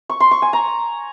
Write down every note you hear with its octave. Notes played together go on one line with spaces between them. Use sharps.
C#6
C6
C#6
G#5
A#5